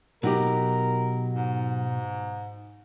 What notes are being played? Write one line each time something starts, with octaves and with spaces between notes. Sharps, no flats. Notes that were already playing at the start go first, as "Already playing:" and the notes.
B2 F#3 D#4 G4 A#4
G#2